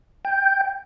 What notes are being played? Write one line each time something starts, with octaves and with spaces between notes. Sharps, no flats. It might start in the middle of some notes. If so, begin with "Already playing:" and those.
G5